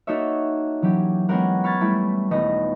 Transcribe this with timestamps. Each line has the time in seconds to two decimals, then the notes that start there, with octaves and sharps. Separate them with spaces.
0.07 A#3 D#4 F#4 A4 C#5 E5
0.82 E3 F#3 C#4 G4
1.29 G#3 B3 C#4 G4 A#4 F#5
1.64 B5 C#6 F6 G#6 A6
1.81 G3 A3 E4
2.31 D#1 A3 B3 D#4 D#5 A#6